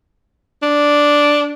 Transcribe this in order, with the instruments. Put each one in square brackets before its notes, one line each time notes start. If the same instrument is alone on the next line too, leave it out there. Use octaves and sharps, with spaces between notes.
[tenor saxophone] D4